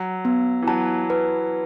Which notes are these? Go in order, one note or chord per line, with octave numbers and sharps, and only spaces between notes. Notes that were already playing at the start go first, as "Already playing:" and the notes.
Already playing: F#3
B3
E3
F#3 A5
B4